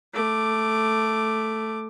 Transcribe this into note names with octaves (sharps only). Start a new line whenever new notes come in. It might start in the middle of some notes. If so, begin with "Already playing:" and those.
A3 D6